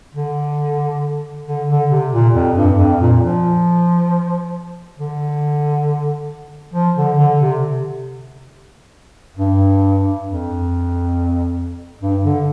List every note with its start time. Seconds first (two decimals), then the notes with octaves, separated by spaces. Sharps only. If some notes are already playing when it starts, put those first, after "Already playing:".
0.14 D3
1.47 D3
1.68 D3
1.91 C3
2.13 A#2
2.34 F2
2.56 G2
2.78 F2
3.00 A#2
3.22 F3
4.98 D3
6.74 F3
6.96 D3
7.18 D3
7.40 C3
9.37 G2
10.26 F2
12.01 G2
12.23 D3